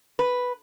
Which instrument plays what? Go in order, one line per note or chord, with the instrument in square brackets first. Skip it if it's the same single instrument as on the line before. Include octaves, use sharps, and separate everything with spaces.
[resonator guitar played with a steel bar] B4